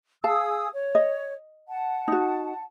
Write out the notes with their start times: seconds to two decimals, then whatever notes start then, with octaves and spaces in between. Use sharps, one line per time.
0.24 G#4 F5 A5 D#6 E6
0.73 C#5
0.95 D#5
1.68 F#5 A5
2.08 D#4 F#4